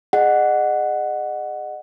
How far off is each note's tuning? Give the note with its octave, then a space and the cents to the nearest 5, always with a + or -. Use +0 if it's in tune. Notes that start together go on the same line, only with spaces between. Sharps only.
G#4 +0 D#5 -35 F#5 +0